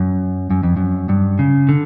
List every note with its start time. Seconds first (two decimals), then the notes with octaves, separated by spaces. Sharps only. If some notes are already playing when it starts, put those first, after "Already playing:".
Already playing: F#2
0.51 F#2
0.63 F2
0.77 F#2
1.09 G2
1.39 C#3
1.69 D3